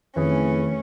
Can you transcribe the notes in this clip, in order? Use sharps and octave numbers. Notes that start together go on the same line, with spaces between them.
F2 D#3 E3 A3 C#4 G#4